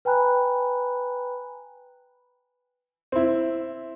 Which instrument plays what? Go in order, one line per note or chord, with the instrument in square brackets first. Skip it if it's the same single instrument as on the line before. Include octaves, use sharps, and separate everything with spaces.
[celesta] B4 G5 G#5 A#5 B5 F#6
[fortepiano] C4 E4